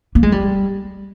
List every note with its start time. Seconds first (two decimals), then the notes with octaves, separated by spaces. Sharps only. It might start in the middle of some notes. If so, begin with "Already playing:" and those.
0.15 A#3
0.23 G#3
0.32 G3